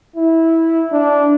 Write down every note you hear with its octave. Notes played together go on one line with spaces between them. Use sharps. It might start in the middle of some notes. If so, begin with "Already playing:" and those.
E4
D4